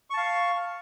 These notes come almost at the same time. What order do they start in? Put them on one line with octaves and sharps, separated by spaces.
C#6 A5 F5